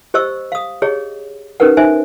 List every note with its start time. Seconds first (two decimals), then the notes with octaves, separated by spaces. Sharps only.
0.14 G4 C5 D#5 C#6 E6
0.52 F5 D#6
0.82 G4 G#4 C#5 D#5
1.60 C#4 D#4 G4 A#4 B4 F#5
1.77 D#4 C5 E5 G#5